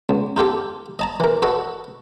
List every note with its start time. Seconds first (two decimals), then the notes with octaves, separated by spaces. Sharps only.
0.09 C#2
0.37 D#4 F4 G4 A4
0.99 D#5 A5 A#5
1.20 E3 A#4
1.42 F#4 A4 B4 D#5